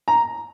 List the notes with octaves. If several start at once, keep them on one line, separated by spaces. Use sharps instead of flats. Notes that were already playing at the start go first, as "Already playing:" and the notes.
A#5